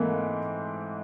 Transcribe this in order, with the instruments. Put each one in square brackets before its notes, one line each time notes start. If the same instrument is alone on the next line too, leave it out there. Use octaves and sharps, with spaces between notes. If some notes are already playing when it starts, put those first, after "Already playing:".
Already playing: [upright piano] G#2 E3 A3 C4 [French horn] A#3